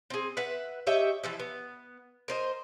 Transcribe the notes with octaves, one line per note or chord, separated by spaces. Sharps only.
C4 G#4
B4 E5 F#5
G4 C#5 D#5 E5
E3 F3 E5
B3
A#4 C5 D#5